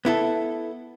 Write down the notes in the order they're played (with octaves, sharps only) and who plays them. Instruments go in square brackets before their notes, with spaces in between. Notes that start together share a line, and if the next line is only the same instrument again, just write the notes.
[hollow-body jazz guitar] B3 E4 A4